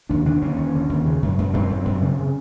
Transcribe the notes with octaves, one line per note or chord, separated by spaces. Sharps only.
D#2 D4
D3 D4
D#2 C#4
D#2
D3
D#2
C#3
F#2
F#2
F#2 C4
F#2
F#2
C#3
C#3